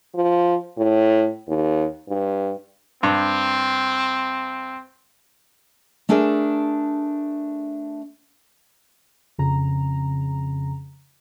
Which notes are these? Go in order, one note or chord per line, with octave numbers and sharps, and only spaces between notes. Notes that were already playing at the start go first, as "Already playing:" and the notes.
F3
A2
D#2
G2
G2 C4
A3 D4 G#4 A#4 E5
F2 C#3 A#5